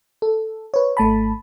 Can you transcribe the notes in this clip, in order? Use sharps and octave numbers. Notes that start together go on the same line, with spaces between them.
A4
B4 C#5
G#1 A3 A5 B5